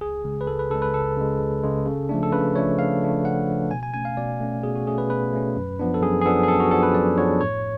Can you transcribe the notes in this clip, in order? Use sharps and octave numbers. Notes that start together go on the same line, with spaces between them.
C#2 G#4
C#3 G#3
B4
C#2 A4
B4
C#3 G#3 A4
B4
C#2 A4
C#3 G#3
C#2
C#3 G#3
C#3
F3 A3 D4
A4
C#3 B4
F3 A3 D4 C#5
C#3 F5
F3 A3 D4
C#3 F#5
F3 A3 D4
B2 G#5
G#5
A3 C#4 G#5
F5
B2 D5
A3 C#4
B2 G#4
F#4
A3 C#4 G#4
B4
B2 B4
A3 C#4
F#2
F3 B3 D4
A4
F#2 G#4
G#4
F3 B3 D4 A4
G#4
F#2 A4
F#4
F3 B3 D4 A4
B4
F#2 D5
F3 B3 D4 C#5
A2 C#5